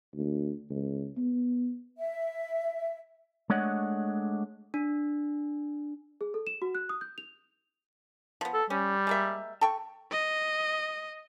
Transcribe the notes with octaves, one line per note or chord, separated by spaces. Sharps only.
D2
C#2
B3
E5
G#3 A3 D4 C#5 D#5 F#5
D4
G#4
A4
E7
F#4
F#6
D#6
G6
F7
F3 B3
A4
G3 C#4
G#3 A#3 E5
A4 G5 C#6
D#5